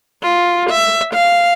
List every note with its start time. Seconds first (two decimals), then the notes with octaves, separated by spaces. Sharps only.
0.22 F4
0.70 E5
1.14 F5